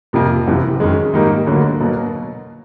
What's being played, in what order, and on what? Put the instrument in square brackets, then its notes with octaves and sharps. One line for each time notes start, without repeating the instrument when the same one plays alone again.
[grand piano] F2 C3 F3 A#3
F#1 E2 C3
F#2 D#3 G#3
G#2 D#3 G3 A#3 D#4
D2 D3 F#3 A#3
B2 F#3 A#3